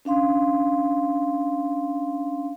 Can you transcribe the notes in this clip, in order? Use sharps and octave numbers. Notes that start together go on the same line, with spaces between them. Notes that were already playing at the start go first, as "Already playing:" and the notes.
C#4 D4 F5 C6